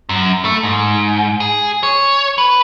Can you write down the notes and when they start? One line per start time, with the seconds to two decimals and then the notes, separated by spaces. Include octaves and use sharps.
0.09 F#2
0.45 A3
0.63 G#2
1.40 G#4
1.83 C#5
2.38 B4